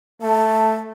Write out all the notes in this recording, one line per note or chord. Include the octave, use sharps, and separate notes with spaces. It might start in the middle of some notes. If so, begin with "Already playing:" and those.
A3 A5